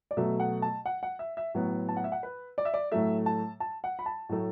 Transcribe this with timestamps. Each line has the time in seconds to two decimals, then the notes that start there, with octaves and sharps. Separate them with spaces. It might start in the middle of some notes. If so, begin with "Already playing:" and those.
0.11 D5
0.17 B2 F#3 A3 E5
0.40 F#5
0.62 A5
0.86 F#5
1.03 F#5
1.19 E5
1.37 E5
1.54 A2 F#3 B3
1.89 A5
1.97 F#5
2.04 E5
2.12 F#5
2.23 B4
2.58 D5
2.65 E5
2.74 D5
2.92 A2 F#3 A3 E5
3.26 A5
3.60 A5
3.84 F#5
3.99 B5
4.06 A5
4.29 A2 F#3 A3